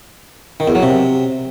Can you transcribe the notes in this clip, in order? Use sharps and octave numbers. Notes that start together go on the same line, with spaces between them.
D#3
E2
F#3
C3